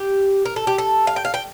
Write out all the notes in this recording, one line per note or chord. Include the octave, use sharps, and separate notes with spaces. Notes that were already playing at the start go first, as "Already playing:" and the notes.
Already playing: G4
A#4
A4
G4
A4
F5
G5
F5
G5